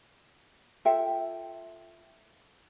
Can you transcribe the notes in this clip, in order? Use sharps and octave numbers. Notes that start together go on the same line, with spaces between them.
F4 A4 E5 G5